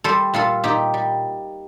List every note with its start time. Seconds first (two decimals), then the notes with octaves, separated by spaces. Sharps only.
0.04 G3 A4 C5
0.34 A#2 F4 A4
0.64 A#2 D#4 G4
0.94 G3